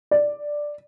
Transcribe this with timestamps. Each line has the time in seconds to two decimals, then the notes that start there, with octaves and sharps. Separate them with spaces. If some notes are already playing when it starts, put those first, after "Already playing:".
0.11 D5